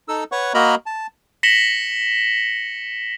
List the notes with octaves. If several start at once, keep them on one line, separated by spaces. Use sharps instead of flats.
D#4 A4 E6
B4 C#5 F#5 C#6
A#3 F#4 A#4 D#5 A#5 B5
A5
A#6 B6 C#7 E7 F#7 G7